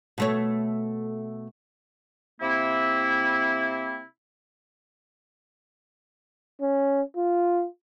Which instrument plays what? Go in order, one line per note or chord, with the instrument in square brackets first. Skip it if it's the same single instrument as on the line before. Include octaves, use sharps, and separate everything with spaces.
[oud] B2 A3 C#5
[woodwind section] C3 A#3 C4 E4
[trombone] C#4
F4